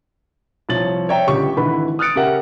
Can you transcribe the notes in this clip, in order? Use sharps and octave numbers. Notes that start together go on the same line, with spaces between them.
C2 F3 C#5 A6 F#7
C#5 D5 E5 G5 A#5
G1 C#2 G4 C#6
G#1 D3 E3 B4 B5
D#6 F6 F#6 A6 C#7 D7
C#3 C#4 G4 A#4 E5 F#5